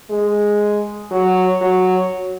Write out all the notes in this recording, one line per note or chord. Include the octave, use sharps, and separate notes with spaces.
G#3
F#3
F#3